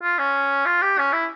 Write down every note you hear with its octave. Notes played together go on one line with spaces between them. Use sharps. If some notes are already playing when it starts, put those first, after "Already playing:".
F4
C#4
F4
G4
C#4
E4